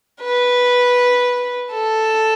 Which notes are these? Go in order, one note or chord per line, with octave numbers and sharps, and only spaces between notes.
B4
A4